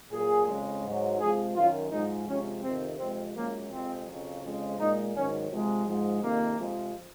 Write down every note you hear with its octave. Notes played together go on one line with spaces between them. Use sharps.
A#2 F#3 G#4
F2 C#3 G#3
G#2 F#3
C3 F3 G#3 G#4
F#2 D#3 F#3 F4
G#2 F3 G#3 D#4
C3 F3 G#3 C#4
F2 C3 D#3 C4
F2 C3 F3 G#3 C4
F#2 F3 G#3 A#3
F2 C3 F3 G#3 C4
F2 C#3 F#3
F2 C#3 F3 G#3
A#2 G#3 D#4
G#2 D#3 F#3 C#4
C3 F3 G#3
G#2 F3 G#3
F2 C3 D#3 A#3
F2 C3 F3 G#3